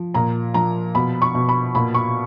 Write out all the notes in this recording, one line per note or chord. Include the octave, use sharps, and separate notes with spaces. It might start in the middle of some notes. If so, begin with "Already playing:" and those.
Already playing: F3
A#2 A#5
F3 A#5
B2 B5
C#6
B2
B5
A#2 B5
C#6